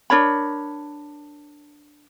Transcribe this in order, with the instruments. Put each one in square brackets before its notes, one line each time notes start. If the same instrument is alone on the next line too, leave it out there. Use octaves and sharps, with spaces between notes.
[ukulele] D4 A#4 C#5 B5